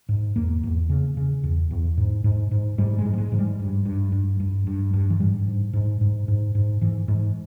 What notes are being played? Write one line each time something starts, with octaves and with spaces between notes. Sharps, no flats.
G#2
E2 A#3
E2
C#3
C#3
E2
E2
G#2
G#2
G#2
G#2 G3
G#3
G#2
G3
G#3
G#2 E3
G3
G2
G2
G2
G2
G2
G2
E3
G#2 G3
G#2
G#2
G#2
G#2
G#2
G#2 E3
G#2